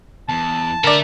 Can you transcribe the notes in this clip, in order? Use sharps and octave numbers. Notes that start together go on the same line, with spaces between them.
E2 A5
D3 A4 A#4 D5 E5